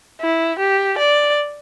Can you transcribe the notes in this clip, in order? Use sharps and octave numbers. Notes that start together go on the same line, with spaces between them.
E4
G4
D5